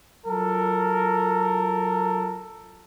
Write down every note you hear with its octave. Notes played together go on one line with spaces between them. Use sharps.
F#3 F4 A4 A#4